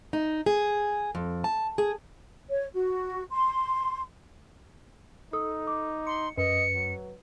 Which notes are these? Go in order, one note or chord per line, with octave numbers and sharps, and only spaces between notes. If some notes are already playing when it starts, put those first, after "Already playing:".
D#4
G#4
F2
A5
G#4
C#5
F#4
C6
D#4 A4 D#6
D6
C6 C#7
F#2 B4 D#5 C#7
F#3